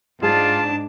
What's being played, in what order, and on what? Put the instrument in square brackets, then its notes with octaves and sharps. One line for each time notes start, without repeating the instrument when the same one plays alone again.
[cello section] G#2 D4 [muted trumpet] F4 [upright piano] G#4 [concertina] A5